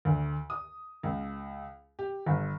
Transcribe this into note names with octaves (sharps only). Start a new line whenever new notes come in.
D2
D#6
C#2
G4
G1